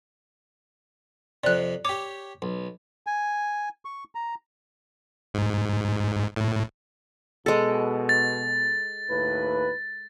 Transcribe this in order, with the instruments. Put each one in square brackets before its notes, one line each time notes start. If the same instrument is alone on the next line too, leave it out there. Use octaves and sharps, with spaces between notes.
[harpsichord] F2 C3 [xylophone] D5 F#6
[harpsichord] G4 C#5 [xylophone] D6
[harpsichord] B1
[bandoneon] G#5
C#6
A#5
[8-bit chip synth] G#2
A2
[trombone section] B2 [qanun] G#3 A4
[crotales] A6
[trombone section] D#2 A2 B4